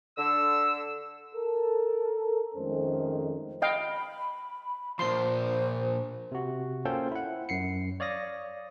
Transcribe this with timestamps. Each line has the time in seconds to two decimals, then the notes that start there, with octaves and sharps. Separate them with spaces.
0.18 D3 E6
1.35 A4 A#4
2.55 F2 D#3 G#3 A3 C#4 C5
3.62 D#5 F5 G5 B5
4.99 A#2 F3 C5 C6
6.32 C3 F#4
6.85 A#3 C#4 F4 A4 C5 G5
7.11 E4 F#5
7.49 F#2 C7 C#7
8.00 C#5 D5 F5 D#6 A#6